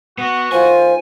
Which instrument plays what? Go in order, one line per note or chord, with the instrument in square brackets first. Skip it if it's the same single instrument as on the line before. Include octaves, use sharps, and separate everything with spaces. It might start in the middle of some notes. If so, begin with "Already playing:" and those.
[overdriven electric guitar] B3 [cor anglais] F#4
[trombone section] D#3 A3 F4 [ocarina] C5 [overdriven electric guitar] G#5